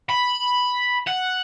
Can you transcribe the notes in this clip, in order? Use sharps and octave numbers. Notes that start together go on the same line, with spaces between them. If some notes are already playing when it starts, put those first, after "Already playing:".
B5
F#5